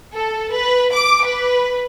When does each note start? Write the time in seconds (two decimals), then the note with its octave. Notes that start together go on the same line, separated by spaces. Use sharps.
0.15 A4
0.52 B4
0.93 D6
1.24 B4